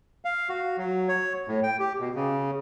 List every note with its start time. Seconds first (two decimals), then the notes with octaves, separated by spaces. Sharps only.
0.25 F5
0.49 F#4
0.78 F#3
1.08 C#5
1.48 A2
1.63 G5
1.79 G4
2.00 B2
2.15 C#3